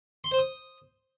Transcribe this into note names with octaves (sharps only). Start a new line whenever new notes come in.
C6
C5
D#6